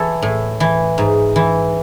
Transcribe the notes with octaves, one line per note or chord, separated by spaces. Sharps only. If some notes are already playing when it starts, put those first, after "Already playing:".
Already playing: E3 A4 C#5
A2
E3
G#2
E3